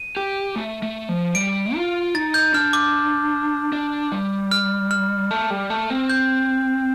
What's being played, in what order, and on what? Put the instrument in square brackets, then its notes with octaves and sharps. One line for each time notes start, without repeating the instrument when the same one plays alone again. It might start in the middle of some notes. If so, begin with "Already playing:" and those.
Already playing: [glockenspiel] D#7
[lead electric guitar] G4
A3
A3
F3
[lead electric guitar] G3 [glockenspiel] D7
[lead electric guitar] F4
[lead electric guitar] D#4 [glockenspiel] A6
[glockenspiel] G6
[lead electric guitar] D4 [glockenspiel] F6
[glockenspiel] D6
[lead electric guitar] D4
G3
[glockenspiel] F6
F6
[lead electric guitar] A3
G3
A3
C4
[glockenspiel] G6